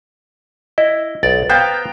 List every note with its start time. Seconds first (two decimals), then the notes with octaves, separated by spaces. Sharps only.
0.78 E4 D#5
1.23 B1 D5 A6
1.49 B3 C5 F5 G5 A#5